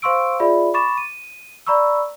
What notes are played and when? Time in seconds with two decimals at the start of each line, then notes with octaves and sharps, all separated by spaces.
0.02 C5 F5 C6 C#6 E6 D7
0.40 F4 G#4 D5 E5 B5
0.74 B5 C#6 D6 A6 E7
0.97 D#7
1.66 D5 A#5 B5 C#6 E6